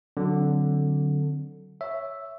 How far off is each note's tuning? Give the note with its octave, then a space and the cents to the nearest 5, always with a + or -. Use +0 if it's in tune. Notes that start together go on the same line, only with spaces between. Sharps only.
D3 +0 F#3 +0 C4 +0
C#5 +0 E5 +0